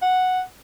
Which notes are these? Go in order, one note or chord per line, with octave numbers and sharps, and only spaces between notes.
F#5